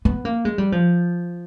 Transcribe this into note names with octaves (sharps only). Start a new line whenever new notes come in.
B3
A#3
G#3
G3
F3